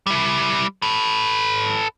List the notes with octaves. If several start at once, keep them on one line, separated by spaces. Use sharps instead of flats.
G3 E4
A4 B4